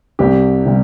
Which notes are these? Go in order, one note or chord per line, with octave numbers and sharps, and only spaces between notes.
C2 C3 G3 G4
C3 G3